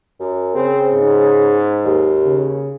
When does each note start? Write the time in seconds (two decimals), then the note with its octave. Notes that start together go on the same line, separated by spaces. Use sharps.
0.20 F#2
0.55 C#3 C4
0.93 G#2
1.85 D#2
2.24 C#3